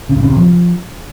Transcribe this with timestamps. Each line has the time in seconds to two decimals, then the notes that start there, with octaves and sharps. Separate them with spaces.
0.09 C#3
0.16 G2
0.23 C#3
0.30 C3
0.37 F3